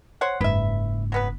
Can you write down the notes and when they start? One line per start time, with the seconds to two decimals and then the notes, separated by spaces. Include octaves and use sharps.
0.21 C5 C#5 F#5
0.41 F#1 G#2 B4 E5
1.12 F#3 B3 B4